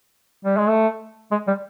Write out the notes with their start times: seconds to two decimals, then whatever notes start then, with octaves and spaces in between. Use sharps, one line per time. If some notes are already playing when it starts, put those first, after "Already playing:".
0.45 G3
0.57 G#3
0.69 A3
1.31 G#3
1.47 G3